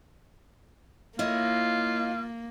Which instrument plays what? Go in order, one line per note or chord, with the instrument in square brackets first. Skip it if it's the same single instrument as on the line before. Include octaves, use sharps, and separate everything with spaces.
[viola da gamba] A#3 [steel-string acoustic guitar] E4 C#5 D#5 [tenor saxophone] F4